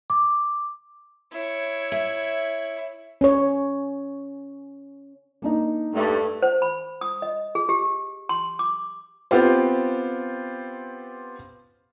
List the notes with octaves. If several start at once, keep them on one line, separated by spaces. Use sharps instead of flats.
D6
E4 C#5
E5
C#4 C#5
A#3 D4 D#4
G2 A3
C5
B5
D#6
D#5
G#4
G4
C6
D6
B3 C4 F4 G4 C5